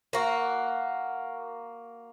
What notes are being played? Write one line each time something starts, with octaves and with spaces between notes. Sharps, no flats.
A#3 F#4